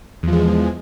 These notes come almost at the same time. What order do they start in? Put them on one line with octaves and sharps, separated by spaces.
E2 F3 G#3